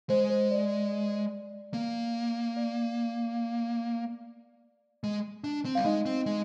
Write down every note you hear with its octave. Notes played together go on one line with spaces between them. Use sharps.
G#3 C5
C5
D5
A#3
D5
G#3
D4
C4
G3 F5
G#3 D#4 D#5
C4
G#3